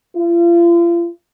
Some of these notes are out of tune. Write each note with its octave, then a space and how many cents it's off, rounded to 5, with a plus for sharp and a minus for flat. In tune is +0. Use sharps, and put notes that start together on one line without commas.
F4 -40